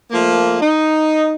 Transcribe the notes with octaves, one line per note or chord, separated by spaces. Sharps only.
F3 A3 A#3
D#4